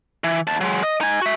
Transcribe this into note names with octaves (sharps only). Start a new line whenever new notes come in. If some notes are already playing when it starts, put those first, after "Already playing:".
E3
D#2 A5
F#3 G#3
D#5
D#4 G#5
F#4 E5